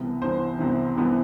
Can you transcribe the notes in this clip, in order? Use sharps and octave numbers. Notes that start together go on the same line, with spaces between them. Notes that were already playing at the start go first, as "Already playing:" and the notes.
Already playing: C2 C3 E3 B3
C2 C3 E3 B3 C5
C2 C3 E3 B3
C2 C3 E3 B3